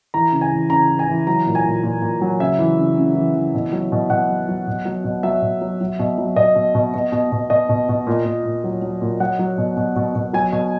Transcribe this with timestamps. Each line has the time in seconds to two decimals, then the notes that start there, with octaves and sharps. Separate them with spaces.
0.14 E3 A#5
0.32 C#3
0.41 G#5
0.52 E3
0.70 C#3 A#5
0.90 E3
0.99 G#5
1.08 E3
1.27 F#3 A#5
1.46 A#2
1.55 G#5
1.65 A#2
1.83 A#2
2.02 A#2
2.22 F#3
2.40 C#3 E5
2.59 E3
2.78 C#3
2.98 C#3
3.15 E3
3.35 E3
3.54 B2
3.72 F#3
3.92 B2
4.10 B2 F#5
4.30 F#3
4.49 F#3
4.67 B2
4.85 F#3
5.04 B2
5.23 F#3 E5
5.42 B2
5.62 F#3
5.81 F#3
5.99 B2
6.18 F#3
6.36 B2 D#5
6.55 B2
6.75 B2
6.94 B2
7.12 B2
7.32 B2
7.50 B2 D#5
7.69 B2
7.89 B2
8.07 A#2
8.25 A#2
8.45 A#2
8.64 F#3
8.82 F#3
9.02 A#2
9.20 F#3 F#5
9.39 F#3
9.58 B2
9.77 B2
9.96 B2
10.15 B2
10.33 F#3 G#5
10.52 B2